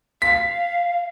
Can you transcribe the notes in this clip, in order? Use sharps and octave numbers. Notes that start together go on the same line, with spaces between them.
F5 B6